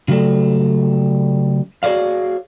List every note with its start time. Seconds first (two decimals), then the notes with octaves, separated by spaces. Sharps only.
0.08 C#3 F#3 G3 A3
1.83 F#4 G#4 C#5 D5 F5